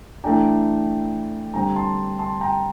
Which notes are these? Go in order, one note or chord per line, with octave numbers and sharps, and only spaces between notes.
E3 A3 D4 G5 A#5
D3 G3 C4 G5 A#5
A5 C6
A5 C6
G5 A#5